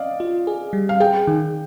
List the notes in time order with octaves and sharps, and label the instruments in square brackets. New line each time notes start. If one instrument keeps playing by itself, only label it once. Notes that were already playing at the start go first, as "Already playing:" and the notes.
Already playing: [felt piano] D5 D#5 F5
[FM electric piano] F4
G#4
G3
[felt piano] F5
[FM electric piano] G#4 [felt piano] G5
[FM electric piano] D#3